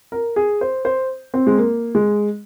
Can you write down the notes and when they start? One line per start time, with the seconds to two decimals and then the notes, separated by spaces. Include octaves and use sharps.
0.12 A#4
0.36 G#4
0.61 C5
0.85 C5
1.34 C4
1.47 G#3
1.58 A#3
1.95 G#3